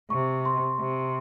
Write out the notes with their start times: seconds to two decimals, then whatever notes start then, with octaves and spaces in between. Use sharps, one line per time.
0.10 C3 C#6
0.45 C6
0.80 C3